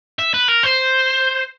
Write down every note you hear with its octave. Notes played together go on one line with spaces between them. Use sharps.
E5
B4
A#4
C5